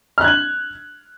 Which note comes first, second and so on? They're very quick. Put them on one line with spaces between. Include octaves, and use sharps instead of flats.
F6 F#6 G#6 F#7